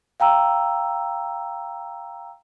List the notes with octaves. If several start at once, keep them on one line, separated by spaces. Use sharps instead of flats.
F5 G5 A#5 E6